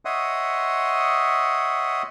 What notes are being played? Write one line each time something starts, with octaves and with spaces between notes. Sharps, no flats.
C#5 D#5 E5 F#5 C6 D#6